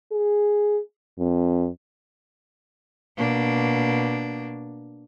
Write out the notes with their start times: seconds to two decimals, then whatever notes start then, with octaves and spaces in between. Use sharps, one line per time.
0.12 G#4
1.18 F2
3.17 B2 A#3 D4